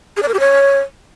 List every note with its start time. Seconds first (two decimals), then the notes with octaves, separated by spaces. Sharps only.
0.17 G#4
0.23 D5
0.28 A#4
0.34 G4
0.40 C#5